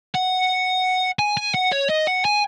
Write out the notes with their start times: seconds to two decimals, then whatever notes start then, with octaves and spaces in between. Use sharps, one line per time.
0.15 F#5
1.19 G#5
1.37 G#5
1.54 F#5
1.72 C#5
1.89 D#5
2.07 F#5
2.25 G#5